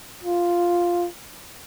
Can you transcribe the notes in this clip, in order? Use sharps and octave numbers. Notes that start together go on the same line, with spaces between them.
F4